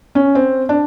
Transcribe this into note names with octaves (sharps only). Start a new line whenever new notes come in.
C#4
C4
D4